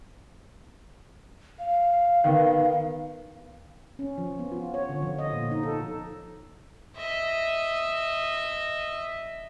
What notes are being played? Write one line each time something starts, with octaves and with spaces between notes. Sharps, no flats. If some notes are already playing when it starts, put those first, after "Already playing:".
F5
D#3 B3
C#4
F3
B3
F4
C#5
D3
F3
D#5
A#2
D#4
A4
D#5 E5